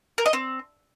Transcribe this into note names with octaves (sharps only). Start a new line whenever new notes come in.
A#4
D#5
C4